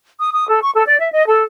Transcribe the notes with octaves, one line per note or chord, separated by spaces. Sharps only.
D#6
D#6
A4
C#6
A4
D5
E5
D#5
A4